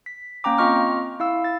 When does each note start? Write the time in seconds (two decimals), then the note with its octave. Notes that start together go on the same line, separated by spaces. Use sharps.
0.06 B6
0.44 A#3 C#4 G5 A#5 D6
0.58 C4 F4 D#5 C#6 F6
1.20 E4 F5 E6
1.44 A6